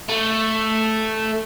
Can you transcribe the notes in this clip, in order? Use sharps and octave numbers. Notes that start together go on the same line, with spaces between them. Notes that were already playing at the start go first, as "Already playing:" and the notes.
A3